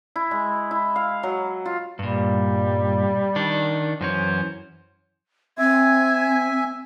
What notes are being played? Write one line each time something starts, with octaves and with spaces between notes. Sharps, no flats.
E4
G#3
E4
F5
F#3
F4
G2 A#2 G3
D#3 D4
F#2 E3 C#4 C5
C4 E5 G#5 G#6